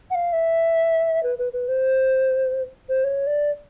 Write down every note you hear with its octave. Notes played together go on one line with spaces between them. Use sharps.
F#5
F5
E5
B4
B4
B4
C5
C5
C#5
D5